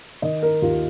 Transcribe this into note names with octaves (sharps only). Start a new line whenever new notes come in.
D#3 D#5
A#4
D#2 F4